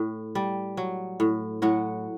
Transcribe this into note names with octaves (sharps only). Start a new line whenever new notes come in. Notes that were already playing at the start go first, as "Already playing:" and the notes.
Already playing: A2
G3
F#3
A2
A2 F#3 F#4